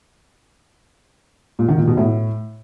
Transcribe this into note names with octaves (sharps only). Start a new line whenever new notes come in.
A#2
D#3
A#2
B2
A2